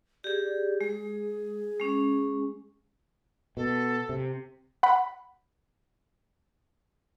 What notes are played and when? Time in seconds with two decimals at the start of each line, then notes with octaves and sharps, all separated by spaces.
0.24 G4 G#4 D5
0.81 G#3 G#4
1.79 G#3 C#4
3.57 B2 A4
4.09 C3
4.83 F#5 B5